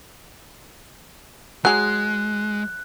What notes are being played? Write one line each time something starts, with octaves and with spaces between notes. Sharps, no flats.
F#3 G#3 G#4 F#6